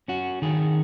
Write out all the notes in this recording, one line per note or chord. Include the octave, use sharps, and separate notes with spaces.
C#4 F#4
D#3 G#4